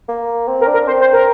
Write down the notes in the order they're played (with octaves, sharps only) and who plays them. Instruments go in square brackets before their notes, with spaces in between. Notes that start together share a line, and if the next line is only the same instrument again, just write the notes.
[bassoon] A#3
C4
[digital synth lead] A#4
[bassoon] D4
[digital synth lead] A#4
[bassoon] C4 [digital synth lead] C5
[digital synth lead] C5
A#4